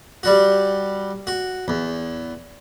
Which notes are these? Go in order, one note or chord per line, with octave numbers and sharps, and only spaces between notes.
G3 F#4
F#4
E2